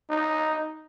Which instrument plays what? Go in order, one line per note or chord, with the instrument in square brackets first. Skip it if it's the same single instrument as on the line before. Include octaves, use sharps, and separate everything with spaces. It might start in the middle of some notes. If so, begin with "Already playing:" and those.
[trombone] D#4